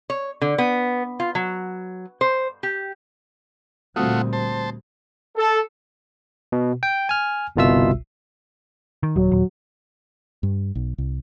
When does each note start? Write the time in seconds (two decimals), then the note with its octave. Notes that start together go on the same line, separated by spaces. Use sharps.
0.10 C#5
0.42 D3
0.58 B3
1.20 F4
1.35 F#3
2.21 C5
2.63 G4
3.96 D2 A#2 G3 A3 C4 F4 F#4 D#6
4.33 C5 A5
5.36 A4
6.52 B2
6.83 G5
7.09 G#5 F6
7.56 G1 C2 B2 F4 E5 E6
9.03 D#3
9.16 D#1 F#3
9.32 D#1
10.43 G2
10.75 B1
10.98 C2